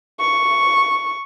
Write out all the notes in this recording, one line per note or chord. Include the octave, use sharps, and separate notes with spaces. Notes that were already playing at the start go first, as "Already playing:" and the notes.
C#6